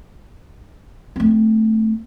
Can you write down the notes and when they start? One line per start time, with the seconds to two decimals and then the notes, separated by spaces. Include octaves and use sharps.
1.16 A3 C4